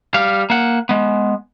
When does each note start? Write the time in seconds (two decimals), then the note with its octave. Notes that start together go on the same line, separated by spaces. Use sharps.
0.14 G3 F5
0.50 A#3 F#5
0.89 G#3 B3